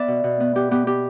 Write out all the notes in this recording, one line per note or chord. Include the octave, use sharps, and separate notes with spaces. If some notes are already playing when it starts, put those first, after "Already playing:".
Already playing: B3 D5 E5
B2
B2
B3
B3 G4
B3 G4
B3 G4